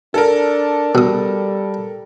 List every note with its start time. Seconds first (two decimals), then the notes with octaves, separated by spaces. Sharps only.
0.14 D4 A4 A#4
0.95 B2 G3 D#6